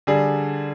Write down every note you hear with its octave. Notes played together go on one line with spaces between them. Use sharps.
D3 G3 G#4